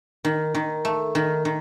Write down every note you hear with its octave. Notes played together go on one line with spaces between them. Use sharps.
D#3
D#3
A3
D#3
D#3